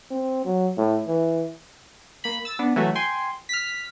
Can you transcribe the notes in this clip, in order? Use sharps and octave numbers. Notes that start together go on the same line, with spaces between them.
C4
F#3
A2
E3
A#3 B5
E6 A6
B3 D4
E3 F#3 A3 F#4
G5 G#5 C6
F6 B6